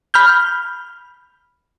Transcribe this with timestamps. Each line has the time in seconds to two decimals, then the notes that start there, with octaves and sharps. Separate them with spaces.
0.14 B5 F6 G6